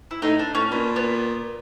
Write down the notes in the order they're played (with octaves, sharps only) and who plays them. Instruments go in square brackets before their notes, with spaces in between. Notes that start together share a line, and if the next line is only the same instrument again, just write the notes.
[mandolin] E4
[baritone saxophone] A2 [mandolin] D#4
[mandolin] D4
[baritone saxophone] A2 [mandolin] C#4
[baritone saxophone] A#2 [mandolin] B3
[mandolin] B3